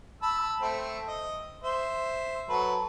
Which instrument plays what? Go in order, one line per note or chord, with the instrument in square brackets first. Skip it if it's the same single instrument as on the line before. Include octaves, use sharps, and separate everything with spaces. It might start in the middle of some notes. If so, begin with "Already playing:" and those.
[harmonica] A5 B5 E6
A3 C4
D#5
C5 E5
F#3 A4 B4